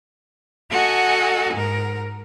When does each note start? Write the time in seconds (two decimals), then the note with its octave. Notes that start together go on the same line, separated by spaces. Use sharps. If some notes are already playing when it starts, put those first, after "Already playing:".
0.71 F#4 A4 D#5 F#5 G#5
1.54 G#2 A#4